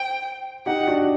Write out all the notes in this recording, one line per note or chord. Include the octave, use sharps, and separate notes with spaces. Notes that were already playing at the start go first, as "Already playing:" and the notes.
Already playing: C5 G5
D#4 G4 F#5
D4 F#4